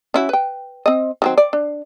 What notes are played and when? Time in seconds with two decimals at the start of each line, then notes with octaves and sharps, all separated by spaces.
0.14 C#4 E4 F#4
0.29 B4 G5
0.86 C4 D#5
1.22 D#3 F#3 C4
1.38 D5
1.53 D4